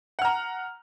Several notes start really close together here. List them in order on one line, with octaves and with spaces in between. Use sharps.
F#5 F6 A#5